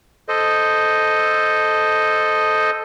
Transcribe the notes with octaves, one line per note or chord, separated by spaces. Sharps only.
A4 C5 D#5